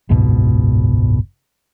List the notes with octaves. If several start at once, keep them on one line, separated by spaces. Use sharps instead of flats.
F#1 C#2 G#2 B2